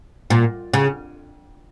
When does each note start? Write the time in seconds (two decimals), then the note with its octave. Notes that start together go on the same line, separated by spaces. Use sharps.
0.30 A#2
0.74 C#3